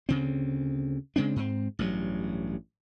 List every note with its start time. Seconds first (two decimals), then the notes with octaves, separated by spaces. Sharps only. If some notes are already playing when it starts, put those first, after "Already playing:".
0.09 D2 C#3 C4
1.16 C#3 G#3 C4 D4
1.36 G#2 C4
1.79 A1 G2 F#3